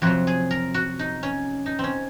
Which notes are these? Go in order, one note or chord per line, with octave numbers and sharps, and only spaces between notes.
F2 C3 F#3 F#4
G#4
A#4
F#4
D#4
C#4
D#4
C4 C#4